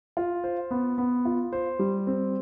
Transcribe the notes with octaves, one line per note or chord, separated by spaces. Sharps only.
F4
C5
B3
B3
F4
C5
G3
C4